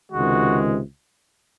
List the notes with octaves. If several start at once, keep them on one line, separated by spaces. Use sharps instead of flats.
C#2 C3 D#3 G#3 F#4